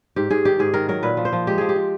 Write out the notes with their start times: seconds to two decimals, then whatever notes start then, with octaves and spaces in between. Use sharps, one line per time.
0.16 G#2 G4
0.31 G#2 G#4
0.45 D#3 G4
0.59 G#2 G#4
0.74 D#3 A#4
0.88 F#3 A#4
1.03 A#2 B4
1.17 F3
1.25 C5
1.33 F3
1.47 G#3 G4
1.58 F3 G#4
1.69 G4
1.76 F3